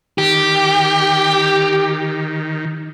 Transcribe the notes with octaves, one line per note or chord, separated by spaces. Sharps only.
D#3 G4